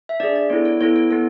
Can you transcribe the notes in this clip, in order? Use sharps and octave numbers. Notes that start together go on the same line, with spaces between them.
E5
D4 G#4 D5
D5
B3 E4 A4 C#5
C#5
B3 E4 A4 C#5
C#5
B3 E4 A4